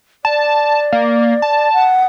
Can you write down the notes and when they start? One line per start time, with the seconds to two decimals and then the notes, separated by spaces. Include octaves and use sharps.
0.25 D5 A5
0.92 A#3
1.42 A5
1.73 F#5